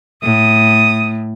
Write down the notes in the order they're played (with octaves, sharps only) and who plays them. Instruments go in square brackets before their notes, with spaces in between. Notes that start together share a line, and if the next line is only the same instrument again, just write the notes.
[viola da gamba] A2 [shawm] D#6